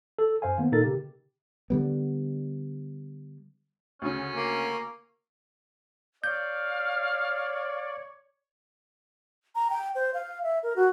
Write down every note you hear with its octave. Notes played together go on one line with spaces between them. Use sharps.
A4
F#2 C5 F5 G#5
D#3 A#3 B3
A#2 A#3 D#4 A4 A#4 A6
C#3 G4
D3 G3 B3
D2 C#3 C#4
A#3
C#5 D5 F5 G6
A#5
G5
C5
F5
E5
A#4
F#4